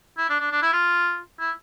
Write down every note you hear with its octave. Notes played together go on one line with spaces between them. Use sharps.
E4
D4
D4
D4
E4
F4
E4